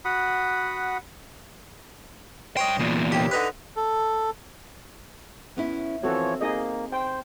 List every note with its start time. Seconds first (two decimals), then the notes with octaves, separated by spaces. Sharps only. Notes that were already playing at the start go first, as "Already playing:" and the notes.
0.05 F#4 F#5 B5 D#6
2.57 G2 C5 C#5 D#5 G5
2.79 E2 A#2
3.12 D#2 G4
3.31 D3 D#4 B4
3.76 A4
5.56 B3 C#4 E4
6.03 E3 F3 C4 F#4 A4 C#5
6.41 A#3 D#4 G#4 D#5
6.92 C5 G5